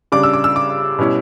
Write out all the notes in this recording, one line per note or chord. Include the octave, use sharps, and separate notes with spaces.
C#3 G3 D4 D6
E6
D6
E6
D6
B2 G3 C#4 E4